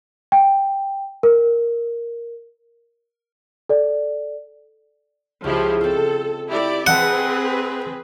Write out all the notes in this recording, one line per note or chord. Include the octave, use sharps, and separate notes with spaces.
G5
A#4
A4 D5
C#2 F3 E4 G4
C4 F4 A4
E4 G4 D5
C4 G#4 B4 D#5 F#5 A5